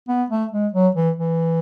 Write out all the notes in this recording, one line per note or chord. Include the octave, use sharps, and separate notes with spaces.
B3
A3
G#3
F#3
E3
E3